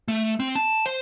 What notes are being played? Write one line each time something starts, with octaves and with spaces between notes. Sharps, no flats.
A3
C4
A5
C5